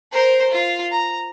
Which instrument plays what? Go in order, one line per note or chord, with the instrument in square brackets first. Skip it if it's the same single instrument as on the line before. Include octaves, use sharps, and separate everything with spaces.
[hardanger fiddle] A#4 C5
F4
A#5